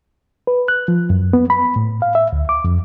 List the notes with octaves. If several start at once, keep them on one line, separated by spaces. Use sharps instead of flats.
B4
F#6
F3
F#2
B3
B5
A2
F5
E5
D2
D6
F2